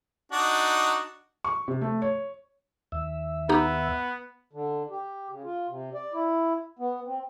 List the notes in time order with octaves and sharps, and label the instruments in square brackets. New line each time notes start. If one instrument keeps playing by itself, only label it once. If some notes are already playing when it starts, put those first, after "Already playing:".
[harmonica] D4 D#4 F#4
[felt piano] C#6
C3
A3
C#5
[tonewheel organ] D#2 E5
[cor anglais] B3 [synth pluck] D#4 G4 A#5
[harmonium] D3
G4
C#3
F4
C3
D5
E4
B3
C4